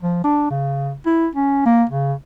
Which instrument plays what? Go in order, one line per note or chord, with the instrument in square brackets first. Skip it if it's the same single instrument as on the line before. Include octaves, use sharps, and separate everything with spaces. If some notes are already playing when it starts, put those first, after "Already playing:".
[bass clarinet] F3
D4
C#3
E4
C#4
A#3
C#3